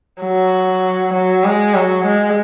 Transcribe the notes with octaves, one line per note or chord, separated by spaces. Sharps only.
F#3
F#3
G#3
F#3
G#3